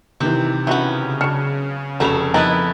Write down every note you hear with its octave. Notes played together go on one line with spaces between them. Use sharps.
C3 D#3 E3 C4
C#3 B3 C#4 E4 F#4 F#5
F#3 D4 F6 C#7 E7
F1 F#3 A3 C#4 A#4 B5 F7
F2 B3 D#4 E4 A#4 B4 A#5 A6